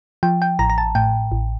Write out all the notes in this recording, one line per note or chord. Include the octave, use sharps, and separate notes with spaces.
F3 G5
G5
A1 A#5
A#5
A5
A2 G5
A1